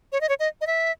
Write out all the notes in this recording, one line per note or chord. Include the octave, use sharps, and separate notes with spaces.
C#5
D#5
C#5
D#5
D#5
E5